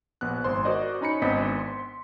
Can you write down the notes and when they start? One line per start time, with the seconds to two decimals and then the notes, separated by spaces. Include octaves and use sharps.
0.21 A#1 B3 F#6
0.44 G#1 C5 C6
0.65 F#4 A#4 C5 D5 D#5
1.01 C#4 D#4 B5 C#7
1.22 G#1 B3 C4 D4 D#5 B6
1.59 C6